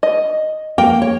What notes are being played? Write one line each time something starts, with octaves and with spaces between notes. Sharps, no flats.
D#5
A#3 G5
C#5